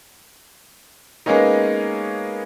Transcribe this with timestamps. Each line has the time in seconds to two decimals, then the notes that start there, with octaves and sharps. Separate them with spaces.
1.26 G#3 A#3 B3 C#4 D#4